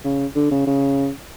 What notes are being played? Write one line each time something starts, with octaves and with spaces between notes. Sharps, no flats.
C#3
D3
C#3
C#3